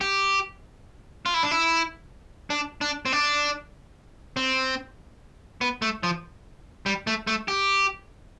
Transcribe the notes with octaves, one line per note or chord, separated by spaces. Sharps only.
G4
F4
E4
D4
E4
D4
D4
C4
D4
C4
B3
A3
F3
G3
A3
A3
G4